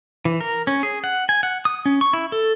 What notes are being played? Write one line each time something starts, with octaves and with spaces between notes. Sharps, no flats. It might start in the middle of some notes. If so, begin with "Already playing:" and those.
E3
A#4
C#4
G#4
F#5
G#5
F#5
D#6
C#4
C#6
E4
A4